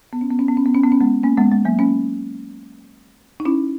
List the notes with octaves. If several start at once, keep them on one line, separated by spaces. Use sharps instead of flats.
B3
C#4
B3
C#4
B3
C#4
B3
C#4
B3
C#4
G#3 B3
A#3 C#4
G#3 B3
G#3
F#3 A#3
A#3 C#4
D#4
C#4 E4